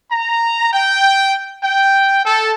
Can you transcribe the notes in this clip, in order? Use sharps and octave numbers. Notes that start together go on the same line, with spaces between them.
A#5
G5
G5
A4